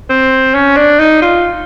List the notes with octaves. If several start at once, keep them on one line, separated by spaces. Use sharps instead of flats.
C4
C#4
D4
D#4
F4